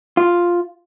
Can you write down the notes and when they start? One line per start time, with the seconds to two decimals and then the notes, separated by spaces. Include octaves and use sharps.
0.17 F4